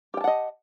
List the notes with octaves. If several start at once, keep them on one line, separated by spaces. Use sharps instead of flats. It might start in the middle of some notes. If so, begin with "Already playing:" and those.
G4 D#5 F#5 G5 A5